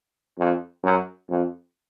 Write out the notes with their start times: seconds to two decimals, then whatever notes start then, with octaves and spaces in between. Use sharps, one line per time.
0.38 F2
0.83 F#2
1.29 F2